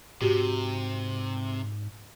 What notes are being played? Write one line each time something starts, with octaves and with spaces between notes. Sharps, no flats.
G#2 C3 F#4 G4